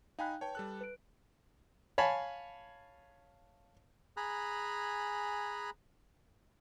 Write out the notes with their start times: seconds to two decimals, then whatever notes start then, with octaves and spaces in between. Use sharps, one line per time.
0.19 D#4 F5 G5 G#5 B5 F#6
0.41 B4 C#5 G5 A5
0.55 G3 A4 F#6
0.81 B4 D7
1.98 C#5 F5 G#5 A5 B5
4.17 G#4 G#5 A#5 B5 F#6